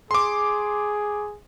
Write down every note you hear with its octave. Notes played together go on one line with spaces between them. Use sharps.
G#4 C6 D6